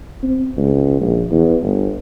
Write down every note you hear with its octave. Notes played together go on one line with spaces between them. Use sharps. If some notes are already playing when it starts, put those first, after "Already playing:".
C4
C#2
A#1
E2
G1